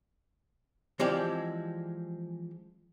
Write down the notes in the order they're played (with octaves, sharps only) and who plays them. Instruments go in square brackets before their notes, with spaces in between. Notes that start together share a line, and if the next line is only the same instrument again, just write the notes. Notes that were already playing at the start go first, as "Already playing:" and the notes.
[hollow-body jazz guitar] E3 F3 G#3 C4 G4 D5